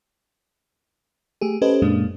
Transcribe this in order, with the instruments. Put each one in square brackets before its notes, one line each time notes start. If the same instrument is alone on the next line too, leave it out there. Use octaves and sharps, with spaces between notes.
[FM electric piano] A3 G4 G#4
C#4 G4 A4 B4 C5 D#5
F#2 A#2 G#3 A#3 D4